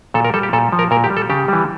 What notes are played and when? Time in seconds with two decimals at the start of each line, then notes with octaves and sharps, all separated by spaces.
0.14 A#2 A4
0.24 A#4
0.34 G3 A4
0.43 G4
0.53 A#2 A4
0.72 F3
0.79 A#4
0.91 A#2 A#4
1.04 G4
1.10 G3
1.17 A4
1.30 C#3 G4
1.48 E3 G3